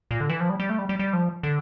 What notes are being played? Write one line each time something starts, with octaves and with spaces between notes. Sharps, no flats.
A#2
D3
E3
F3
G3
G3
A3
G3
G3
G3
F3
D3